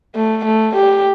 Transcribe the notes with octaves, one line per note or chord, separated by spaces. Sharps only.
A3
A3
G4